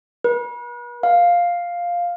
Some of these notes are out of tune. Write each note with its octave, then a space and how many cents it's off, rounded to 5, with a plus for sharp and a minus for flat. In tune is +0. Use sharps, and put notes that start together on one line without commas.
B4 -40
F5 +5